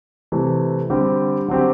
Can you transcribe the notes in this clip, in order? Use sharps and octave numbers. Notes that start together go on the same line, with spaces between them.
C3 E3 A3
D3 G3 C4 G4
D3 F#3 C4 G4